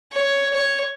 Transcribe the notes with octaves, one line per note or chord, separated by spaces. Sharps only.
C#5
C#5